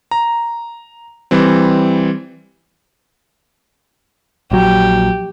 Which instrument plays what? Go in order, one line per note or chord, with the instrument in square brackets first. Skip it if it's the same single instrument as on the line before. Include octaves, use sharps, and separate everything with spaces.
[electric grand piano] A#5
E3 G3 C4
[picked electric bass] A#1 F#3 [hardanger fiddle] G4